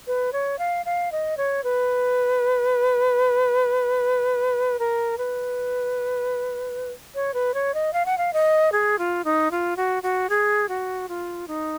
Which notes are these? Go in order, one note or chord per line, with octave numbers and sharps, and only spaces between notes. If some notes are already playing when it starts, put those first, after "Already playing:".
B4
C#5
F5
F5
D#5
C#5
B4
A#4
B4
C#5
B4
C#5
D#5
F5
F#5
F5
D#5
G#4
F4
D#4
F4
F#4
F#4
G#4
F#4
F4
D#4